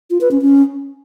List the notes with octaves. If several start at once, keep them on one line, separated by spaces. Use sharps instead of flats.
F4
B4
C#4
C#4